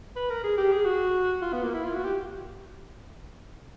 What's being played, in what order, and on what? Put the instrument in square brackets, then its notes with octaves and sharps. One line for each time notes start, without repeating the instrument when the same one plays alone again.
[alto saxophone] B4
A#4
G#4
G4
G#4
F#4
F4
B3
A#3
E4
F4
F#4
G4